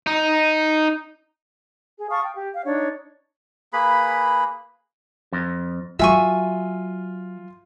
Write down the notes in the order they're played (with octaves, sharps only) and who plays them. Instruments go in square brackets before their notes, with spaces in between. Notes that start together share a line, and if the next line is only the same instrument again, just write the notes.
[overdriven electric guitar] D#4
[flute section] G#4
F5 A5 C#6 D#6
G5
G4
F5
D4 D#4 C#5
[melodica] A#3 G#4 B4 B5
[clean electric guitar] F2
[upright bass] F#3 [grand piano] F4 D#7 [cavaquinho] E5 G#5 C#6